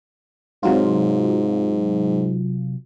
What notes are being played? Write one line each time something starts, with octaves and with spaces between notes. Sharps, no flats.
G#2 C3 F#3 F4